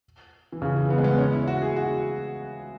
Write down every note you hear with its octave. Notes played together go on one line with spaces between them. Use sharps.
E3
C#3
E3
B3
G#3
B3
C#4
E4
F#4
G#4
F#4